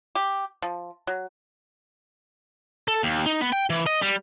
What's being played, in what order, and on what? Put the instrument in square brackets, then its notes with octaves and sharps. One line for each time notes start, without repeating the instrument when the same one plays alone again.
[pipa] G4
F3
F#3
[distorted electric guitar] A4
D#2
D#4
B3
G5
E3
D#5
G3